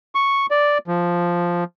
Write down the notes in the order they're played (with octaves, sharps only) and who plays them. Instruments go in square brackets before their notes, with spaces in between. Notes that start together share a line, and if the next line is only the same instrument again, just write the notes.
[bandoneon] C#6
D5
F3